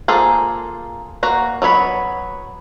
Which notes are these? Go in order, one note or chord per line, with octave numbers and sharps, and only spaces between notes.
A#3 F4 G#4 A4 C5
A#3 F#4 A#5
F#3 B3 C#5 B5